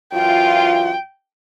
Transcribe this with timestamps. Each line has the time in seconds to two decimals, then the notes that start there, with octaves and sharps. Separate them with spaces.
0.14 F#2 E3 F4 G5